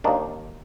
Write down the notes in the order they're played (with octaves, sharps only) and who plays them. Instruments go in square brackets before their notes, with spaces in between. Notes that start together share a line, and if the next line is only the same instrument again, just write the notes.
[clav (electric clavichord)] D#2 D#3 D4